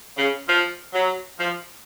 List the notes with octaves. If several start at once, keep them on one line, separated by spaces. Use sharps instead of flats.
C#3
F3
F#3
F3